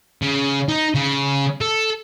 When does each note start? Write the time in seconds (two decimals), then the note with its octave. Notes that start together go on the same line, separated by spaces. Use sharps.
0.22 C#3
0.68 D#4
0.95 C#3
1.61 A4